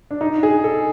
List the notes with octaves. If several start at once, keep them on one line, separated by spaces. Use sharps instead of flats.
D4
D#4
G#4
A4